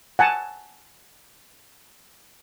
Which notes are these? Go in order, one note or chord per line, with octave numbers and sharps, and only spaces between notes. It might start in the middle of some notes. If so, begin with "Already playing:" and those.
F#5 G#5 A5